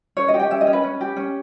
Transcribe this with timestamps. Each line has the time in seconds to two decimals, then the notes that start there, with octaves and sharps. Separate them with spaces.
0.17 C#4 C#5
0.28 D#5
0.34 G4
0.39 G5
0.50 C#4 E5
0.61 D#5
0.67 C#4
0.73 B4
0.83 C#4
1.01 G4
1.16 C#4